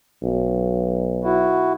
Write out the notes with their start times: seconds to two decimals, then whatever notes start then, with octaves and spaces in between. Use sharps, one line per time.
0.23 B1
1.24 E4 F#4